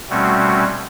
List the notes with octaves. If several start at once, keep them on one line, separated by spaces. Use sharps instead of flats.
B2 G3 A3 C4 C#4 F#4